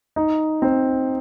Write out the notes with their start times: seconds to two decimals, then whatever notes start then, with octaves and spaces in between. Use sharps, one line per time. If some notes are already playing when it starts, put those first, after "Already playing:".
0.16 D#4
0.62 C4